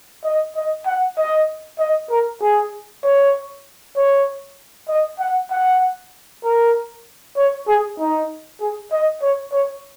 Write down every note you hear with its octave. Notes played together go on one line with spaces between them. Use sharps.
D#5
D#5
F#5
D#5
D#5
A#4
G#4
C#5
C#5
D#5
F#5
F#5
A#4
C#5
G#4
D#4
G#4
D#5
C#5
C#5